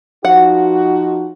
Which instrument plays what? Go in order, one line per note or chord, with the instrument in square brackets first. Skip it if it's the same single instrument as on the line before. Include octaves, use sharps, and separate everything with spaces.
[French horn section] F3 D#4 F#4 [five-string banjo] F#5